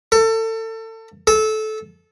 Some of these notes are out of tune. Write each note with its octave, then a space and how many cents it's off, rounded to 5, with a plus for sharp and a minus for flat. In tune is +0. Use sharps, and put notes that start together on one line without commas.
A4 +30
A4 -20